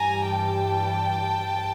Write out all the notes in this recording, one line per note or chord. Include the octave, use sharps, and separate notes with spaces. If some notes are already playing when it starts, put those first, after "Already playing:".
Already playing: G2 E3 G3 G#5 A#5
G5 A5